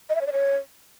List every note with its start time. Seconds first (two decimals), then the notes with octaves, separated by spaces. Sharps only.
0.10 D#5
0.15 E5
0.21 C#5
0.27 D5
0.33 C#5